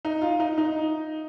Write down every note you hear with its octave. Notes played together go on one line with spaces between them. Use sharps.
D#4
F4
D#4
D#4